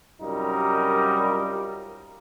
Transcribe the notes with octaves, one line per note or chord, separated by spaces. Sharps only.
C2 F#2 G3 D#4 F4 A#4